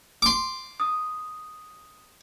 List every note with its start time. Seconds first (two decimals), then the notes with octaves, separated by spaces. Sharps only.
0.22 C6 D6
0.80 D#6